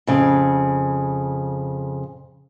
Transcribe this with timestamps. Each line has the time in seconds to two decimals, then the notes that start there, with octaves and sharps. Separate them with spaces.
0.07 F2 C#3